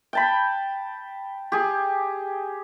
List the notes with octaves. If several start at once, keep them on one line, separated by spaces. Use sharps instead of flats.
G5 A5 B5
G4 G#4